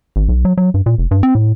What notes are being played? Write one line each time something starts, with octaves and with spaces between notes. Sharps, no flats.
G#1
B1
F#3
F#3
G2
A#2
F1
G2
C4
A2